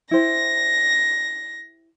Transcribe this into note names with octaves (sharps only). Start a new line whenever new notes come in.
E4 G4 C5 A#6